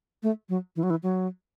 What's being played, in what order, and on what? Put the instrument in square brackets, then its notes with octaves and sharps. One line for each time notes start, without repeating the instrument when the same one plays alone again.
[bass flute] A3
F#3
E3
F#3
E3
F#3